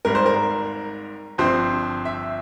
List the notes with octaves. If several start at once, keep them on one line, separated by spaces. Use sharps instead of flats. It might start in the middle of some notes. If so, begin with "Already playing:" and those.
G#1 G#2 G3 A#4
C5
A#4
G1 G2 F3 C4 C5
E5